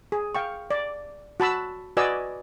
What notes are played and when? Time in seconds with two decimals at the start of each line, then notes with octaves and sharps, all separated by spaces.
0.12 G#4
0.35 F5 G5 C#6
0.71 D5
1.40 F#4 A5 B5 E6
1.97 F#4 B4 D5 D#5 G#5 E6